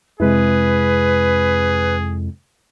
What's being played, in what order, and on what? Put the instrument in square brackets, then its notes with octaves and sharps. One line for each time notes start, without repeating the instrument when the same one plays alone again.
[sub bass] F2 [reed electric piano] C3 G#3 E4 [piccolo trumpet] G#4 [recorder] B4